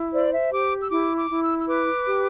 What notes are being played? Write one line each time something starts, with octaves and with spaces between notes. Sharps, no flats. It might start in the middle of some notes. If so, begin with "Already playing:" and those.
Already playing: E4
C5 D5
E5
G4 D6
E6
E4 D6
D6
E4
E6
E6
B4 D6
G4